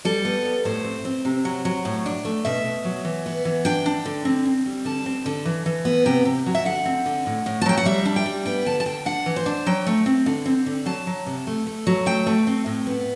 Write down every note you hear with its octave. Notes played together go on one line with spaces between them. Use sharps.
G3 A4
B3
G3
A2 C5
C4
C4
C3
F#3
F#3
A2
D4
A3
B2 E5
B2
F#3
E3
B3
E3
D4 G5
D4
D3
C4
C4
G3
D3 A5
C4
D3
E3
E3
B3
C3 G5
C3
F#3
E5
D3 F#5
C4
D3
A2
A2
A5
F#3 G5
F#5
G3 E5
D4
G5
G3
B3 G5
D3 A5
A5
D3 G5
D4 F#5
E3
C5
D4
F#3 G5
A3
C4
D3
C4
D3
F#3 A5
F#3
C3
A3
A3
F#3
A3 G5
A3
C4
A2
B3